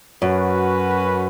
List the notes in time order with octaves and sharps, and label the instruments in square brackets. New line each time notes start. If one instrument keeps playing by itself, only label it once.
[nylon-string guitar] F#2 [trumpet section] C#4 F#4 B4